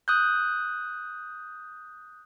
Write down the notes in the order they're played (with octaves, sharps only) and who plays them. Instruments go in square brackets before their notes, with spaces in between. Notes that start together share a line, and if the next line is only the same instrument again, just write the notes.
[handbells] D#6 F#6 G6